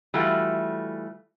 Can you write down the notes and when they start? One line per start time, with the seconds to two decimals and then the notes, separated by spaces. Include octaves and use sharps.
0.14 E3 G3 A3 F4 F#4